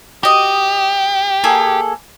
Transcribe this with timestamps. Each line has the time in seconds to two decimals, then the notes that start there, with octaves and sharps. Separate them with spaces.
0.23 F#4 G4 D#5
1.44 A#3 G#4 A4